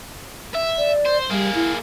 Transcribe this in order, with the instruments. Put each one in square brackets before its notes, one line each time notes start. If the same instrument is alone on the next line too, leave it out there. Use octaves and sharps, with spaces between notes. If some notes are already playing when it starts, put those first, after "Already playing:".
[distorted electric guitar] E5
[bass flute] D5
[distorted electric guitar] C5
[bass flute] G3 [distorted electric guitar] A#3 G#4
[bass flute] E4